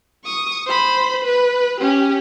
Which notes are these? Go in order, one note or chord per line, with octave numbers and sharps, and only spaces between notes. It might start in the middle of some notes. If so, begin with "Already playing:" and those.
C#6 D#6
C5 B5
B4
C#4 G4